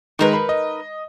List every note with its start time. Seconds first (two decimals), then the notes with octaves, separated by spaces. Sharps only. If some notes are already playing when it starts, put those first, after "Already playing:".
0.19 D#3 G#3 D#4 A#4 B4
0.33 B5
0.49 D#5